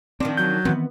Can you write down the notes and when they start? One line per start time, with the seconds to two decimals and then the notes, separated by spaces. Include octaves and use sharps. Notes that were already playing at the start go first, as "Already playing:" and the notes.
0.20 D#3 F3 C4 D4
0.37 F#3 G6
0.65 D#3 E3 B3 C4